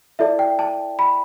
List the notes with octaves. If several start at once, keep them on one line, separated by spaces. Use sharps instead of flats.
E4 A4 D5 E5
G5
A5
B5